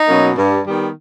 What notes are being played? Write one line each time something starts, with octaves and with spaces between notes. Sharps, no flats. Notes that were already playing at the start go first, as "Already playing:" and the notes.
Already playing: D#4
B2 F#3 A#3 C#4
G2
D#3 G3 B3